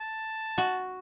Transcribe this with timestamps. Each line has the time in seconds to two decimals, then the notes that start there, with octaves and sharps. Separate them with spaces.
0.01 A5
0.58 F#4